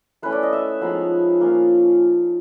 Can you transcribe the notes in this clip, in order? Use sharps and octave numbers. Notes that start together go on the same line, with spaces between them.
A3 C#4 E4 B4
D5
D#5
E5
F3 G#3 B3 D#4
A#3 C#4 F4